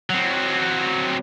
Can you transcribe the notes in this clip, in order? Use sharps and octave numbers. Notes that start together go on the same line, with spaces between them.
F#3 C4